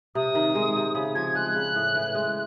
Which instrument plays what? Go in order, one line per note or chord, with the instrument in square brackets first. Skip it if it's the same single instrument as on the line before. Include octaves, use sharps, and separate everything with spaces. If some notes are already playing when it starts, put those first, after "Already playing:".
[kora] C3 [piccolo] D#6
[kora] D#3
G#3
C3
C#3
[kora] F3 [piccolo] G#6
[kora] G#3 [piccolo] F#6
[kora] C#3
A2
E3
G#3